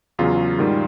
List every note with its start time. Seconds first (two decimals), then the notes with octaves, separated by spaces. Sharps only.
0.19 E2 C#3 F#3 F4
0.59 G#2 D#3 G3